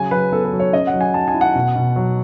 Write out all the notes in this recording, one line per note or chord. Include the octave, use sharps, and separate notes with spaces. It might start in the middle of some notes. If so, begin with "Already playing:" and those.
Already playing: C#3 F#3 G#5
F#3 B4
B3 A4
B4
F#3
C#5
C#4 D#5
F#5
F#3
G#5
F#3 A5
G#5
E4
F#5
B2
B2
F#3